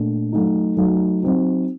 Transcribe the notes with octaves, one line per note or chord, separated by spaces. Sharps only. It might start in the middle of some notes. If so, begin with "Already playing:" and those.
Already playing: A#2 A3 D4
F#3 A3 D#4
F#3 A3 D#4
F#3 C4 D#4